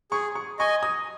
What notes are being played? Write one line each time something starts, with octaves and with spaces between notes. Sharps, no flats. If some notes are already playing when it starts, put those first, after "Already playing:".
G#4 C#6
C#6
D#5 G#5 C#6
D#6